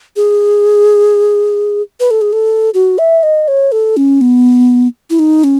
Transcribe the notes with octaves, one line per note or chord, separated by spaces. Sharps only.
G#4
B4
A4
G#4
A4
F#4
E5
D#5
C#5
A4
C#4
B3
E4
D#4
C#4